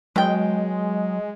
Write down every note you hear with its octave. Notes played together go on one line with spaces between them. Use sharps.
B2 F#3 G#3 G5